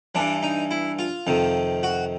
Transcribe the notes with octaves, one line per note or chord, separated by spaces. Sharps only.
G2 E3 D4
D#4
E4
F4
F2 C3 D#3
F#4